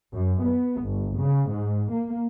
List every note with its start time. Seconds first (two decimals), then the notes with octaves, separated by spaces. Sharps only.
0.14 F#2
0.44 B3
0.81 G1
1.18 C#3
1.50 G#2
1.92 A#3